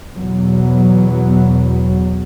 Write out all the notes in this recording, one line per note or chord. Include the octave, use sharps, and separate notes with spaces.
E2 B2 F#3 B3